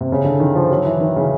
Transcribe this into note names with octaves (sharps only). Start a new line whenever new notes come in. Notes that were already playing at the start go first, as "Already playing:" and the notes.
C3
C#3
D3
D#3
F3
F#3
E3
D#3
C#3